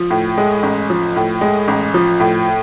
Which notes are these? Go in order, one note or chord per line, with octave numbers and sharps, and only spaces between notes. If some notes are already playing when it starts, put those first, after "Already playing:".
Already playing: F3
A2
G#3
A1
F3
A2
G#3
A1
F3
A2